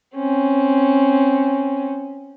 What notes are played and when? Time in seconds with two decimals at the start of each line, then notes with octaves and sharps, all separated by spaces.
0.16 C4 C#4